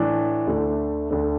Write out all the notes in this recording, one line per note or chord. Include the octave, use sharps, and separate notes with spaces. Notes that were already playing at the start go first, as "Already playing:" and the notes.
Already playing: A2 E3 D4
D2 D3 A3 D4
D2 D3 A3 D4